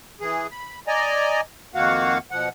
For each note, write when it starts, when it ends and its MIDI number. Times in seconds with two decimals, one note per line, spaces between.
0.21 0.47 52
0.21 0.47 68
0.51 0.79 83
0.87 1.41 74
0.87 1.41 75
0.87 1.41 80
0.87 1.41 82
1.75 2.18 41
1.75 2.18 51
1.75 2.18 58
1.75 2.18 66
1.75 2.18 77
1.75 2.18 78
2.31 2.49 47
2.31 2.49 53
2.31 2.49 78